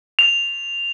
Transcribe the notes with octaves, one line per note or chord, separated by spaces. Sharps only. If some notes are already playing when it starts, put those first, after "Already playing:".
F7